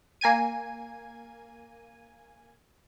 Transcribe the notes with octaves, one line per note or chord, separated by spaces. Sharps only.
A#3 G#5 G#6 D#7